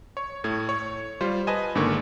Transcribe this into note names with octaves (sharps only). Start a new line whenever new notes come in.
C#5
A2 A3 G#6
C#5
G3 F4 C5
B4 D#5 G#5 A5
G#1 G#2 D3 A#3 C#6